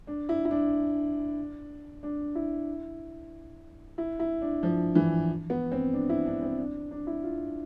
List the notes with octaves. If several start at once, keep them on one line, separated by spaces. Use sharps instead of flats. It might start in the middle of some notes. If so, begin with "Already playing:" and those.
D4
E4
E4
D4
D4
E4
E4
E4
D4
F3
E3
B3
C4
D4
E4
D4
C4
D4
D4
E4
F4